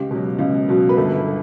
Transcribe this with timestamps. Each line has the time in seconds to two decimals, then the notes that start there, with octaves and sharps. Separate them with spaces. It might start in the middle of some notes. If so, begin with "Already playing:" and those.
Already playing: C#2 G4
0.11 B2 F#3
0.39 C#2
0.69 B2 F#3
0.89 B4
0.97 G1 A4